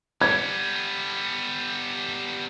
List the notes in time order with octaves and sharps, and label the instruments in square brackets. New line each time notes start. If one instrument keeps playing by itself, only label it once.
[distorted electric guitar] G3 B3 [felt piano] G#6